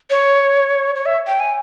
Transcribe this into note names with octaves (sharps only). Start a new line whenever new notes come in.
C#5
C#5
E5
G5
G#5